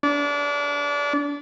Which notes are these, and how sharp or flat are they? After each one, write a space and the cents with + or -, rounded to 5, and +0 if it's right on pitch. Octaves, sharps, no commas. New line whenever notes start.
D4 -30